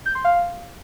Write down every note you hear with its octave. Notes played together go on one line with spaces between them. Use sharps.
G6
C6
F5